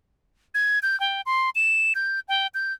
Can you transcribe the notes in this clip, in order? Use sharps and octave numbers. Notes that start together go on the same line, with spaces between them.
G#6
G6
G5
C6
E7
G6
G5
G6